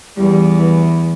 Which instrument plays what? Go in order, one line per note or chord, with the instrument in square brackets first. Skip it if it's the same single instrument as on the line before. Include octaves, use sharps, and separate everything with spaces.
[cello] E2 [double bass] G3
[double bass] E3